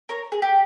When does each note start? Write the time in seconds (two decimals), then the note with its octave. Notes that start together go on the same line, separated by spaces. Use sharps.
0.09 A#4 C#5
0.32 G#4
0.42 G4